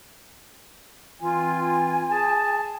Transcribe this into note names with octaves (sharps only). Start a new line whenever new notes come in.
E3 C4 F4 G#5
G#4 A5